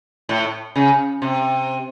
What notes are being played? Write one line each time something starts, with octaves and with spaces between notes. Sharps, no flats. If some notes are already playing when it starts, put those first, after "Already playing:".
A2
C#3
C3